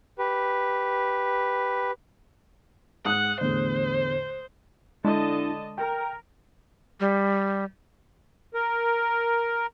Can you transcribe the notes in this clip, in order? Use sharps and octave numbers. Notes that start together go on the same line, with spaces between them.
G4 B4
G#2 F#5 D#6 F#6
E2 A2 D3 C5
D3 G#3 D4 E4 D#5 A5
A#4 G5
G3
A#4